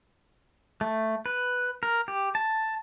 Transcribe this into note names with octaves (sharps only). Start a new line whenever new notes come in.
A3
B4
A#4
G4
A5